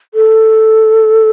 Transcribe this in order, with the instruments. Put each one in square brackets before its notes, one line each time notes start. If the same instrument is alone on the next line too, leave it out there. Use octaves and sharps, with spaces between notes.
[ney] A4